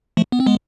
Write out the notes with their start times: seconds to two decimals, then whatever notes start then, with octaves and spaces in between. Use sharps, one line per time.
0.17 F3 A3
0.32 B3
0.40 C4
0.46 G#3 B3